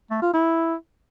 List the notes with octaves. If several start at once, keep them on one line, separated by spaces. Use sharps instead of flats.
A3
F4
E4